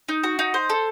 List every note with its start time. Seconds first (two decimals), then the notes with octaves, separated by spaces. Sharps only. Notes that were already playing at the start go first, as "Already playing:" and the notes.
0.09 D#4
0.24 F#4
0.39 D#4
0.54 C5
0.70 A4